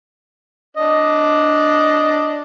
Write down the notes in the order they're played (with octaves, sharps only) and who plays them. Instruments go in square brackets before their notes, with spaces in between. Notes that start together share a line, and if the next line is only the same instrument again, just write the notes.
[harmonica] D4 D#5